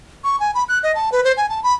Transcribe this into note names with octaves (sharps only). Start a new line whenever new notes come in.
C#6
G#5
B5
F#6
D#5
A5
B4
C5
G#5
A5
B5